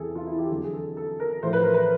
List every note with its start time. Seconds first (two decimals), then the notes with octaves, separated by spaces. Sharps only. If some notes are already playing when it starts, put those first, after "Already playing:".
Already playing: E2 C3 E3 G#4 A4
0.15 F4
0.27 E4
0.39 G4
0.50 F2 D3 F#3
0.64 G#4
0.73 A4
0.97 A4
1.20 A#4
1.43 A2 F3 C5
1.53 B4
1.63 A#4
1.74 B4